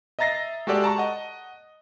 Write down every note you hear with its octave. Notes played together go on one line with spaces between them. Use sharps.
D#5 E5 A#5 A6 A#6 C7
G#3 F#4 G4 A4 D5
A5 A#5 C#6
D#5 F#5